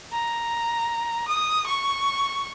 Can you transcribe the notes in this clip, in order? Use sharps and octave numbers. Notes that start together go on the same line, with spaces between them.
A#5
D#6
C#6